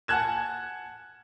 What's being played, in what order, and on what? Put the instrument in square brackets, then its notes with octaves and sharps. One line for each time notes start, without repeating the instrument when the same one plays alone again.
[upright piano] F#5 G#5 A5 F#6 G#6 E7